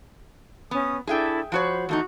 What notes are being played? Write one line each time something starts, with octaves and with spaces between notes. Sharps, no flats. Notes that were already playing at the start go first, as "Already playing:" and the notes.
B3 C#4 D#6
D4 E4 G#4 A4 E5 G5
F3 F#4 C5 C#5 B5
E2 A3 D#4 F#4